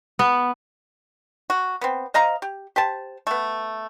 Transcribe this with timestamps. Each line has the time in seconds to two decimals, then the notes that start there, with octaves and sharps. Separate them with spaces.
0.19 B3
1.50 F#4
1.81 B3 C4
2.14 C5 D#5 F5 A#5
2.42 G4
2.76 G4 C5 A5
3.27 A3 B3